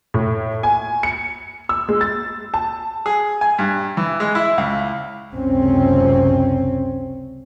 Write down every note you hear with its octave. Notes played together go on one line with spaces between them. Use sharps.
A2
G#5
C#7
E6
G#3
A6
A5
G#4
G#5
G2
E3
G#3
E4
C#2
F#1 C#2 C3 C4 C#4